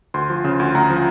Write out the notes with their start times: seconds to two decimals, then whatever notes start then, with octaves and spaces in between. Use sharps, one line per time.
0.14 D2 C6
0.30 F3
0.44 C#3
0.60 D2
0.75 D2 A#5
0.90 F3